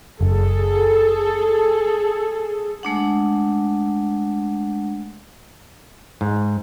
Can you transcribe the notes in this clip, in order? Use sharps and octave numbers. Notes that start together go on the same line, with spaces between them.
F#1 G#4 A4
G#3 A3 D4 F#5
G#2